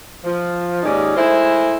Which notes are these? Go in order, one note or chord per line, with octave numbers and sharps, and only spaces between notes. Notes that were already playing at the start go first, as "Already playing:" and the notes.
F3
D#2 G#2 C#4 D#4 D5
G#3 A3 E4 C5